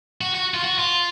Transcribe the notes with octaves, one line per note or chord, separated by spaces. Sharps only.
F#4
F#4
F4
F#4
F4